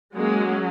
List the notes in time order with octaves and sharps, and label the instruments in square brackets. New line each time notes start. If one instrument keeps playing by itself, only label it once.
[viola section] F#3 G#3 A#3 C#4 G#4